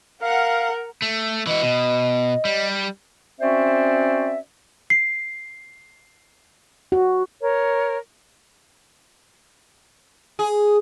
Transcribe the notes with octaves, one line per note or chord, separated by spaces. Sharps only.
A#4 F5 F#5
A3
E3 F#4 D#5
B2
G3
C4 C#4 F#4 C5 D5 E5
C7
F#4
A#4 C#5
G#4